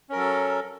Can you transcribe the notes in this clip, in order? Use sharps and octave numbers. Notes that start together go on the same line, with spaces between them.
F#3 C#4 A4 A#4